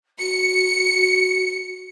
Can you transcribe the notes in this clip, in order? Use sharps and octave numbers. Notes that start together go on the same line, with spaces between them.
F#4 C#7